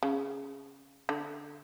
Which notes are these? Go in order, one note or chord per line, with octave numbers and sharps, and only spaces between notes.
C#3
D3